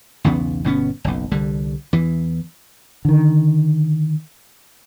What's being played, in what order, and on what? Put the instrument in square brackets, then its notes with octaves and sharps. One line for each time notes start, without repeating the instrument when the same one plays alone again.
[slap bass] B1 E2 C#3 B3
G1 B2 B3 C#4
F#1 B1
C2 D3 G3
E2 E3
[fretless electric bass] D3 D#3